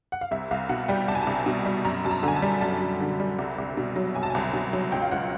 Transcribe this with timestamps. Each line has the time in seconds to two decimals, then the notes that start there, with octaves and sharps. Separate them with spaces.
0.12 F#5
0.21 F5
0.31 C2 E5
0.51 C2 F5
0.69 B2 F#5
0.88 G3 G5
1.08 C2 A5
1.15 G#5
1.23 C2 A5
1.46 B2
1.65 G3
1.85 F#2 A#5
2.05 F#2 A5
2.11 A#5
2.23 D3 G#5
2.36 A5
2.42 G3
2.61 F#2 A5
2.80 F#2
3.00 D3
3.20 G3
3.38 C2
3.58 C2
3.77 B2
3.96 F#3
4.15 C2 G#5
4.23 A5
4.30 C2 G#5
4.53 B2
4.73 F#3
4.92 C#2 G5
5.02 F5
5.11 C#2 F#5